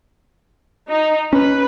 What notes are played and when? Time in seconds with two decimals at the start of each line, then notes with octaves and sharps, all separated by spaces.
0.88 D#4
1.33 C#4 B4